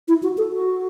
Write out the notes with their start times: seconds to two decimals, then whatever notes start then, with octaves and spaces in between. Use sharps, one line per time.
0.08 E4
0.23 F#4
0.38 A4
0.53 F#4